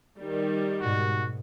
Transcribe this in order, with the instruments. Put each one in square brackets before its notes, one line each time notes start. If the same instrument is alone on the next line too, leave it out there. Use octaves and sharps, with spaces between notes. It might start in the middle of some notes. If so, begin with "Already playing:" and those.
[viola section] D#3 G3
[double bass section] G#2 B2 [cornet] F#4